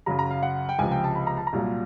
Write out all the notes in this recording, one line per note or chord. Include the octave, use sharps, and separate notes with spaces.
F#2 C#3 F#3 A#5
A#5
F5
F#5
G5
C#2 C3 F3 G#5
G5
A5
B5
A#5
A5
A#5
C2 A#2 F#3